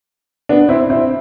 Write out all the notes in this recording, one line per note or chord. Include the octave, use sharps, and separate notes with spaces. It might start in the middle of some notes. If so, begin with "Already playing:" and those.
B3 D4
C4 E4
C4 E4